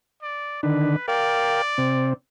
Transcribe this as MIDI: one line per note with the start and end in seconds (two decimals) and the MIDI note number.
0.23 0.63 74
0.63 0.96 50
0.63 0.96 51
0.63 0.96 62
0.63 1.04 71
1.08 1.62 70
1.08 2.13 74
1.08 1.62 77
1.08 1.62 79
1.78 2.13 48
1.78 2.13 60